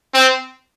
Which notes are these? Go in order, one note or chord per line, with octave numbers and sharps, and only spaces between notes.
C4